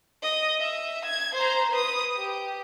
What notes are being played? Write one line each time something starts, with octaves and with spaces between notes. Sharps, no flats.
D#5
E5
G#6
C5 A#5
B4 D#6
G4